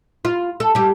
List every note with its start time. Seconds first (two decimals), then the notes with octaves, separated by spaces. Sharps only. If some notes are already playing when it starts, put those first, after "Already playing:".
0.25 F4
0.60 A4
0.75 G3 G4